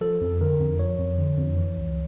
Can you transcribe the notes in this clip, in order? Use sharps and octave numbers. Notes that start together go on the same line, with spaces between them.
F3 A4
F2
D3 A#4
F2
F3 C#5
F2
D3
F2
E3
C#2